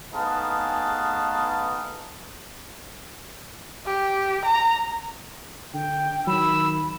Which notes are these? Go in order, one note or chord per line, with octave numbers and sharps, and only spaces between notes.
A3 B3 D#4 G#4 F5 A5
G4
A#5
D3 G5
D#3 F#3 B5 E6